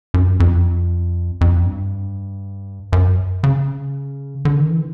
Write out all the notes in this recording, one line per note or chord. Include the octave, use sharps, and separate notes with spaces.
F#2
F2
F2
G2
F#2
C#3
D3
D#3
E3